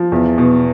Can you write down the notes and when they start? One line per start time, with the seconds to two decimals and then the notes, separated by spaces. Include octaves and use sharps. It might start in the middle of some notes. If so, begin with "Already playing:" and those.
Already playing: F3
0.12 E2
0.38 B2